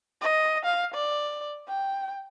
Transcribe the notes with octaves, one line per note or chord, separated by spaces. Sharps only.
D#5
F5
D5
G5